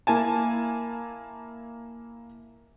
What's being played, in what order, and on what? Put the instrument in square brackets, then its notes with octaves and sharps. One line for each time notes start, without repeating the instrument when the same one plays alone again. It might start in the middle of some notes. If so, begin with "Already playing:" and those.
[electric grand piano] A#3 E4 G#5 A5